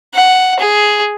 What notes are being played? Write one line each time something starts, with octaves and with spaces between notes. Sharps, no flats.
F#5
G#4